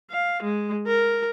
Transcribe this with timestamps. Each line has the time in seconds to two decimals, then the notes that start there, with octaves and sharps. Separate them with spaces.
0.11 F5
0.43 G#3
0.87 A#4